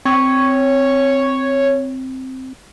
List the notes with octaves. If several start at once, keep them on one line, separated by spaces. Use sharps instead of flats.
C4 C#5